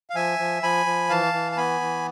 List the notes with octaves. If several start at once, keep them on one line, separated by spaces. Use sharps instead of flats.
F5
F3 E5 G#5
F3
F3 G#5 B5
F3
E3 F5 A5
E3
A5
B3 G#5 B5
E3